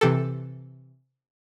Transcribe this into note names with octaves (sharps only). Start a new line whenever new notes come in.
C3 E3 G4 A4